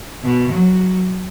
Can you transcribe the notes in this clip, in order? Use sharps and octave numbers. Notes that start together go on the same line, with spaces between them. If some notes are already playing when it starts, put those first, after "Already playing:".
B2
F#3